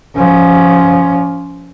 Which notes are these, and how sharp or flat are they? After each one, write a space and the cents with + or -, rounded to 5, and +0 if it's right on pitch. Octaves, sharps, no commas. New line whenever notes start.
F3 +0 C#4 +15